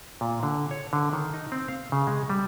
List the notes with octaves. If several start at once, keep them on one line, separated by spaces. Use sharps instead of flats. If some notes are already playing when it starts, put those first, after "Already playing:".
A#2
D3
C#5
D3
D#3
D#4
C4
F5
C#3
G#3
G3